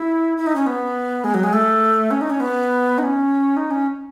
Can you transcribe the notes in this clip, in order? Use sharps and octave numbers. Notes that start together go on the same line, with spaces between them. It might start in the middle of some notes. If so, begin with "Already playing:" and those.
Already playing: E4
E4
D#4
C#4
B3
G#3
F#3
G#3
A3
C#4
D#4
C#4
B3
D#4
C#4
D#4
C#4